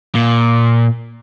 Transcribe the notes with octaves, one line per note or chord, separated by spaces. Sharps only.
A#2